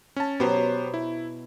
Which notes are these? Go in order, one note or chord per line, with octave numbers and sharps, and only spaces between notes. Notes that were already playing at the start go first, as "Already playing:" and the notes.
C#4 A5
B2 F#3 B3 G4 C5
E4